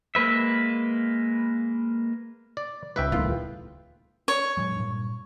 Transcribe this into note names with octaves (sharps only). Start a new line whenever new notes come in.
G#3 A#3 B4 E5
D5
C#2 G#2 B4 E5 G5
D#1 A2 D#3 B3 F4
C#5
A#2 F#3 G#3
G2 A#2